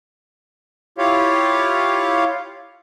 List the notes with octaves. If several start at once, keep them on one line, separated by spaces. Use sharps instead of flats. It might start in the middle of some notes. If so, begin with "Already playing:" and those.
E4 F4 G4 C#5 F5